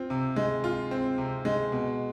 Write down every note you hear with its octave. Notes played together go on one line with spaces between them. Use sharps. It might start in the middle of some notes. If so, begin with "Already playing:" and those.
Already playing: C4 F4
C3
G#3
F4
C4
C3
G#3
B2